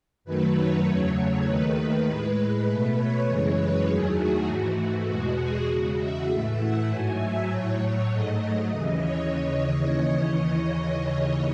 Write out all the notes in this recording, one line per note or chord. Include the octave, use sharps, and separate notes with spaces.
F#2 D#3 F#3 A3 B4
C#5
E2 C#3 F#3 A3
D#2 D#3 A3 B4
B4
A2 G#3
B2 A3
C#5
F#2 C#3 E3 G#3
B4
E2 D#3 F#3 A3 G#4
F#4
G#2 E3 A3 F#4
E2 B2 G#3 F#4
G#4
E2 C#3 G#3 F#4
E5
A2 E3 A3
F#5
G#2 F#3 A3 G#5
E5
A2 F#3 A3 C#5
C#5
G#2 F#3 A3 D#5
D#2 C#3 E3
C#5